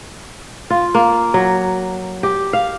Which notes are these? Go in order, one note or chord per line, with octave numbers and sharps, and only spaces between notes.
F4
A#3
F#3
G4
F5